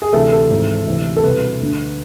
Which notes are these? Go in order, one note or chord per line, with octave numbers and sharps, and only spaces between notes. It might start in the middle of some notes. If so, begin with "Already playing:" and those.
G#4
D2 C3 E3 A4
A4
G#1 G#2 E3
D2 C3 E3
A4
C2 B2 B4
D2 D3